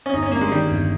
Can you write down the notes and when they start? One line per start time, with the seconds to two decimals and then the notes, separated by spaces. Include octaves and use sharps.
0.06 C#4
0.13 G1 D#4
0.23 C#4
0.32 G2 A#3
0.41 G#3
0.51 D#3 G3
0.71 G1